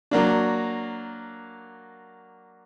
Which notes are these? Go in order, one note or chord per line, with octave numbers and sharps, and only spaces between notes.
F#3 A#3 D4